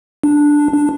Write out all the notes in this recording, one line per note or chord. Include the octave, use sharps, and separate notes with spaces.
D4
D4